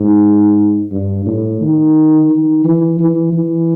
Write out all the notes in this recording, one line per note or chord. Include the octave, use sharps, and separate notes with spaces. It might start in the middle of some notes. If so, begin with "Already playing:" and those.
Already playing: G#2
G2
A2
D#3
D#3
E3
E3
E3